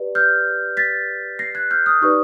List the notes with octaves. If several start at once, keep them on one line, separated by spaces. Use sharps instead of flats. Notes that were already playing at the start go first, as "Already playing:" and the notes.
Already playing: G4 B4 D5
F6 G6
A6 B6
A#6 C7
F#6 G#6
F6 G6
D#6 F6
D#4 G4 B4 D5 C#6 D#6